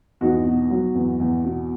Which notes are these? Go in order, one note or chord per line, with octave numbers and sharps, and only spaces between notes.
E2 D#4 F#4
B2
F#3
E2
E2
B2